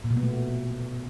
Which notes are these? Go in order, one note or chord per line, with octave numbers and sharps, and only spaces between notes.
A#2
B2
B3
A3